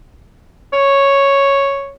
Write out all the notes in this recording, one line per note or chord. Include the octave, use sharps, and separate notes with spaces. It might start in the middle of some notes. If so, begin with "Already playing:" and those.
C#5